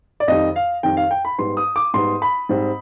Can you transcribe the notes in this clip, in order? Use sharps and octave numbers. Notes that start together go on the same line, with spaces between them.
D5
F2 D#3 G3 D#5
F5
F2 D#3 G3 G5
F5
G5
B5
G#2 G3 B3 C6
D#6
D6
G#2 G3 B3 C6
B5
G#2 G3 C4